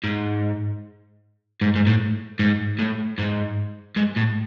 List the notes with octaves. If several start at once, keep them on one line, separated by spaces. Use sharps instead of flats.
G#2
G#2
G#2
A2
G#2
A2
G#2
G#2
A2